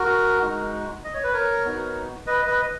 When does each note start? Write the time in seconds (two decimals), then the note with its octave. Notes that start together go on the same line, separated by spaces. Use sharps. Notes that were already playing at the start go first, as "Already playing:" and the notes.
Already playing: F#4 A#4
0.42 G#3 D#4 F#4
1.04 D#5
1.14 C#5
1.24 B4
1.33 A#4 C#5
1.65 B3 D#4 F#4
2.27 B4 D#5
2.47 B4 D#5